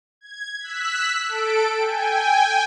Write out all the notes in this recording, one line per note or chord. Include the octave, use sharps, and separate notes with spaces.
G#6
E6 F#6 B6
A4 D7
G5 G#5